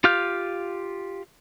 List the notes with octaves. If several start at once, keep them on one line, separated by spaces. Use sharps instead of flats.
F4 G4 F5 F6 G6